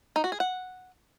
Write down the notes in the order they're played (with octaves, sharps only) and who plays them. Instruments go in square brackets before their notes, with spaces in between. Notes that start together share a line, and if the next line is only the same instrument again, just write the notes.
[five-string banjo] D#4
F#4
G#4
F#5